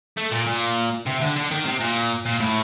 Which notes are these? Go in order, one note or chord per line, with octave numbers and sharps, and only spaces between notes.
A3
A#2
A#2
C3
D3
D3
D#3
C3
A#2
A#2
A2